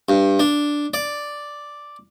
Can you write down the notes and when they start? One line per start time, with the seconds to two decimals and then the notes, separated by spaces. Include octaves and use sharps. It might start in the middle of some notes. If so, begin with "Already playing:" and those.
0.09 G2
0.39 D4
0.94 D5